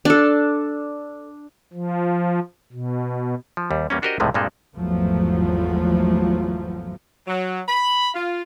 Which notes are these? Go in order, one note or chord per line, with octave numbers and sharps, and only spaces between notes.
D4 A4
F3
B2
F3
D#2 G3
E2 G3 A#3 C#4
D4 F#4 G4 A#4 C5 D#5
C#2 A2 C3 F3 G#3 A3
G2 A#2 G3 G#3 C4 A4
G#1 E2 F3 F#3 A3 B3
F#3
B5
F4